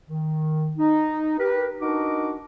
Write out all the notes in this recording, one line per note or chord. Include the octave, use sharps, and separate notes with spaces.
D#3
D#4
G4 A#4 B4
D4 D#4 F#4 A#4 D#5 D6